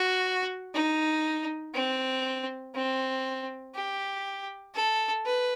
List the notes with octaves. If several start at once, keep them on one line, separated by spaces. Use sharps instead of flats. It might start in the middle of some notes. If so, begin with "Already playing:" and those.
Already playing: F#4
D#4
C4
C4
G4
A4
B4